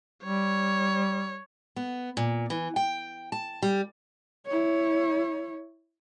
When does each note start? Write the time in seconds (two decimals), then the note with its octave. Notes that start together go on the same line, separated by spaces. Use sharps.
0.24 G3 C#5
1.76 B3
2.17 A#2
2.50 E3
2.76 G5
3.32 A5
3.62 G3
4.46 E4 C#5